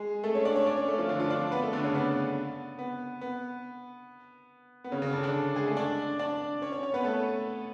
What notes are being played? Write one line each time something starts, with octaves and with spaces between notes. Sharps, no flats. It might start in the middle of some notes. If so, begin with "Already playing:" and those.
Already playing: G#3 G#4
A3 A4
C#4 C#5
D4 D5
C#4 C#5
D4 D5
C#4 C#5
A3 A4
F3 F4
D3 D4
F3 F4
D4 D5
B3 B4
A3 A4
D3 D4
C#3 C#4
B3
B3
B3
B3
C#3 C#4
C#3 C#4
D3 D4
D3 D4
G#3 G#4
A3 A4
D4 D5
D4 D5
C#4 C#5
C#4 C#5
C#4 C#5
B3 B4
A3 A4